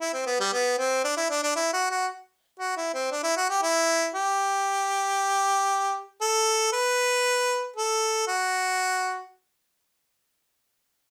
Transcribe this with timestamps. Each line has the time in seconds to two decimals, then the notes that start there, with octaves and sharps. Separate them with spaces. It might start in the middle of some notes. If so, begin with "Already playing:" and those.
0.01 E4
0.13 C4
0.27 B3
0.40 G3
0.53 B3
0.79 C4
1.04 D4
1.17 E4
1.30 D4
1.43 D4
1.56 E4
1.73 F#4
1.91 F#4
2.59 F#4
2.77 E4
2.94 C4
3.11 D4
3.23 E4
3.37 F#4
3.50 G4
3.63 E4
4.14 G4
6.21 A4
6.73 B4
7.76 A4
8.27 F#4